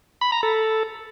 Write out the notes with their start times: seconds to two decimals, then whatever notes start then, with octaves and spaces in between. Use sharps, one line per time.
0.21 B5
0.32 A#5
0.43 A4